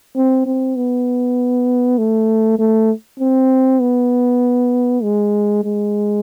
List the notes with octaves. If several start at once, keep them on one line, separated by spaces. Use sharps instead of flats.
C4
C4
B3
A3
A3
C4
B3
G#3
G#3